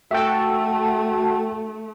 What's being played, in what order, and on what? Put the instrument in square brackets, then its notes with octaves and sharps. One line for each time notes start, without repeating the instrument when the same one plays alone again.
[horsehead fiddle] A3 [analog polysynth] F#4 A4 [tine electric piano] E5 G5